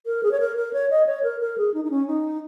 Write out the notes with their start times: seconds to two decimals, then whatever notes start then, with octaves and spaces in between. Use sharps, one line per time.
0.06 A#4
0.23 G#4
0.31 C#5
0.40 A#4
0.56 A#4
0.73 C#5
0.90 D#5
1.06 C#5
1.23 A#4
1.41 A#4
1.58 G#4
1.74 D#4
1.84 D#4
1.91 C#4
2.07 D#4